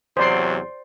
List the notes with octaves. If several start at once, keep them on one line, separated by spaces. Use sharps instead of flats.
E2 C3 F#3 C5 D5 C6